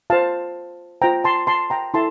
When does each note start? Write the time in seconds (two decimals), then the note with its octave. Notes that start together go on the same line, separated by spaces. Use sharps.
0.10 F4 C5 F5 A5
1.02 F4 C5 G5 A#5
1.24 A5 C6
1.47 A5 C6
1.70 G5 A#5
1.94 E4 A4 A5 C6